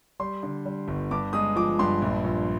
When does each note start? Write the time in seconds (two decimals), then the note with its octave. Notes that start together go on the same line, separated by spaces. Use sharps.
0.20 G3 C6
0.43 D3
0.66 G3
0.88 G1
1.11 G2 D6
1.33 G#3 D#6
1.56 F3 D6
1.79 G2 C6
2.02 A#1
2.24 A#1